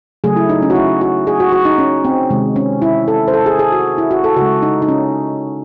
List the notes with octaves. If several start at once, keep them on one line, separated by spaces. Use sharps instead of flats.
C#3 F#3 A3 G#4
E4
D#4
C#4
F#4
E4
F#4
G#4
F#4
F#4
D#4
C#4
C4
C3 D#3 G#3
C#4
E4
A4
C5
A4
G#4
G#4
F#4
E4
F#4
A4
C#3 G#3 F#4
D#4
D#4
C#4